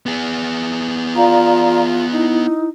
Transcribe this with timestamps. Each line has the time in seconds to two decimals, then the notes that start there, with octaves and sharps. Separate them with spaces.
0.06 B3 G#4
1.16 F4 D5 F5 A#5
2.12 D#4 E4